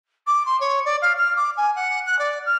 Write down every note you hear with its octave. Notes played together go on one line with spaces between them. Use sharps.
D6
C6
C#5
D5
F5
F6
D6
G#5
F#5
F#6
D5
F6